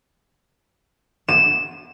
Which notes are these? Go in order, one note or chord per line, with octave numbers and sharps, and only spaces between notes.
E7